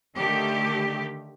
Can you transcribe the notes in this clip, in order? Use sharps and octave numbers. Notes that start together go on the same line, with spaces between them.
D3 D#3 A3 G4